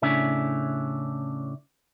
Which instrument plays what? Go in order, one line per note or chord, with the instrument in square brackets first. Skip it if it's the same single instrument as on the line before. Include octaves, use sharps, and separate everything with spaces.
[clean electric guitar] A2 C#3 C#4 D4 E5